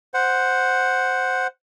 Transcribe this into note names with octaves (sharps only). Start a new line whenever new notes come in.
C5 F#5